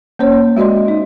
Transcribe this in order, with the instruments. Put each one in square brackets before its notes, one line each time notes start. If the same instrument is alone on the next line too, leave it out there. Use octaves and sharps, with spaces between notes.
[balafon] A#3 C#4 C5 C#5
G#3 F#4 D5 D#5 C6
D#4